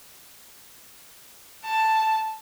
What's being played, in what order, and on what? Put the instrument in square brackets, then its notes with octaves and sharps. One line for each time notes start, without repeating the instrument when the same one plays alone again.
[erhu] A5